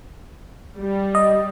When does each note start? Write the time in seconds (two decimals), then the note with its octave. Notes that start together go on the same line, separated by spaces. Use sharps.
0.78 G3
1.15 D#5